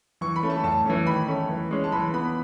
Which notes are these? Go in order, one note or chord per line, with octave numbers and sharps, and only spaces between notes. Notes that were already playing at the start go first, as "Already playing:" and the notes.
E3 C#6
B5
A3 C#4
A5
A2 A5
E3 A3 C#4
D#3 B5
A3 C#4
E3
G#3 C#4
A5
E3 B5
B3 B5